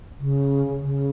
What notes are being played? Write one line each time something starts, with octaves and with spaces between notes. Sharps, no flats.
C#3
C#3